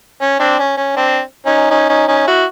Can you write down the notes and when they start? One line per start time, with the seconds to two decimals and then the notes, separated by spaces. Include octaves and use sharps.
0.21 C#4
0.40 C4 D4
0.59 C#4
0.77 C#4
0.96 C4 D4
1.46 C#4 D#4
1.70 C#4 D#4
1.89 C#4 D#4
2.08 C#4 D#4
2.27 E4 F#4